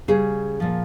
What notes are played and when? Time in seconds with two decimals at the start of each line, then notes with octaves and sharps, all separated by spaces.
0.08 C#3 G3 G#4
0.60 A#2 F3